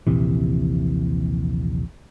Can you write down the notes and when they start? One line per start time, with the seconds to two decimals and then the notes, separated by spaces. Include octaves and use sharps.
0.07 D#1 A#1 C3 E3